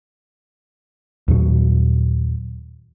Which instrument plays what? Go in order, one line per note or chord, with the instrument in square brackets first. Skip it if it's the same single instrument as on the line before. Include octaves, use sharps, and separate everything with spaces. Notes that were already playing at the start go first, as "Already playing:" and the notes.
[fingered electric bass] D#2 A#2 F#3